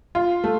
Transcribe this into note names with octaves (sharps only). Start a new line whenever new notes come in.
F4
A3